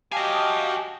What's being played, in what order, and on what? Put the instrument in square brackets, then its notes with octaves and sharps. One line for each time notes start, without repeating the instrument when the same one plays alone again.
[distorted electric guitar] F#4 G#5 [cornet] G4 [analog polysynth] D#5 F5 [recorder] A5